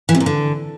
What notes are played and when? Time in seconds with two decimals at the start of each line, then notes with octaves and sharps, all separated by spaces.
0.09 E3
0.15 C3
0.20 A#2
0.26 D3